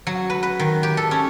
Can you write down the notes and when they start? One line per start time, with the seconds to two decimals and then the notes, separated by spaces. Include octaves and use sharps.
0.07 F#3
0.30 B4
0.43 B4
0.60 D#3
0.83 G4
0.97 A4
1.11 C#4